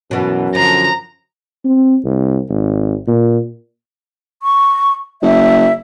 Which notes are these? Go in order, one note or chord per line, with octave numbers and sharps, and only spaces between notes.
F#2 B2 E3
D3 F3 A#5
C4
C2
G#1
A#2
C#6
F#1 E5